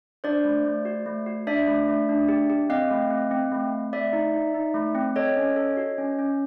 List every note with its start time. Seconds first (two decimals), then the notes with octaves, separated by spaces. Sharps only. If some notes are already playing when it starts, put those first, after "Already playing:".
0.24 D4 C5 D5
0.45 A3
0.65 A3
0.85 F#4
1.06 A3
1.26 F#4
1.47 D4 D5 E5
1.67 A3
1.88 A3
2.09 D4
2.28 G4
2.50 G4
2.70 C4 D#5 F5
2.91 A3
3.11 C4
3.31 C4
3.52 A3
3.73 C4
3.93 A3 D5 E5
4.13 D#4
4.34 D#4
4.54 D#4
4.74 A3
4.95 C4
5.16 A4 C#5 D#5
5.36 C#4
5.56 A4
5.77 F#4
5.98 C#4
6.19 C#4